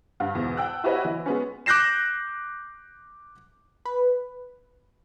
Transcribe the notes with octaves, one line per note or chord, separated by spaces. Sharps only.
G2
E2 G#2 B2
F#5 G5 A5 E6 F#6
E4 F#4 G4 B4 C#5 D#5
E3
G#3 B3 C#4
D6 F#6 G6 A#6 C7 E7
B4